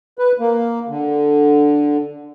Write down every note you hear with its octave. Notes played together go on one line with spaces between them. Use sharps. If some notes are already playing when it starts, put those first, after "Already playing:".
B4
A#3
D3